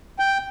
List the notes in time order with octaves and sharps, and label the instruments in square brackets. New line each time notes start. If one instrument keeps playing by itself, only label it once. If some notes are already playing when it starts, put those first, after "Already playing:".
[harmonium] G5